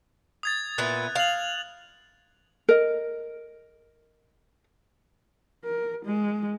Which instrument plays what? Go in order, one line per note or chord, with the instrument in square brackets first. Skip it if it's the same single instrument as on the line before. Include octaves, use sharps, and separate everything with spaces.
[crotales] D#6 G#6 A6
[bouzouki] A#2 B3 E4 [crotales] F#6
[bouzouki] F5 [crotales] F7 F#7
[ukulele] A#4 D#5
[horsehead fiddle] A#4
G#3